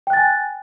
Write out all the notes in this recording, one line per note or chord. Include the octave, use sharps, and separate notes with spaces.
G5 G#5 F#6 A6